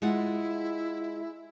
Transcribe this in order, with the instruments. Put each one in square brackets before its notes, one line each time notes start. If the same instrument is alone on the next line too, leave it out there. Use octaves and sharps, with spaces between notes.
[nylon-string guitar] G#3 F4 F#5 [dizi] E4